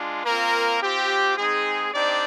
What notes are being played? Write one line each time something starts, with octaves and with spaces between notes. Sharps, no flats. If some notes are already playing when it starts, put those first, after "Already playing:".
Already playing: G#3 D4 F4
A#3 C4 F4 A#4
C4 F4 G4
G#3 C4 D#4 G#4
C4 D4 D#4 G4 D5